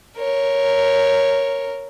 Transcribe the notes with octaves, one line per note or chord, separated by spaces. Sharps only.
A#4 C#5